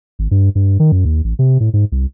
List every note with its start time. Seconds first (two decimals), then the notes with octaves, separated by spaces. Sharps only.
0.19 G#1
0.31 G2
0.55 G2
0.80 D#3
0.92 F#2
1.05 D#2
1.24 A1
1.39 C3
1.60 A2
1.73 G#2
1.92 C2